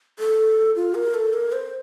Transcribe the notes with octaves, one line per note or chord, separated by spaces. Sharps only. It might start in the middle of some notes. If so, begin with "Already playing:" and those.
A4
F4
A#4
A4
A#4
C5